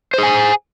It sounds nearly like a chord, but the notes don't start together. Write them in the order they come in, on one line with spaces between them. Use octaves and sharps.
C5 G#4 G#5